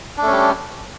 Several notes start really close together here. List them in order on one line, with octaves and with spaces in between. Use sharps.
D4 A3 C#4 G3